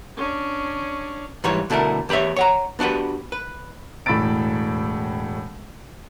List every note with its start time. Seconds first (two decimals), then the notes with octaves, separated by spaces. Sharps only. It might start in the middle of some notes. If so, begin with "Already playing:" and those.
0.17 C#4 D4
1.44 G#2 E3 G3 C#5
1.70 B2 D3 A3 E4 A#4
2.09 E2 G4 B4 C#5 E5
2.36 C#5 F#5 A#5
2.79 B3 D4 F#4 G4 B4
3.32 B4
4.06 E1 A2 B5 E6 A6 D7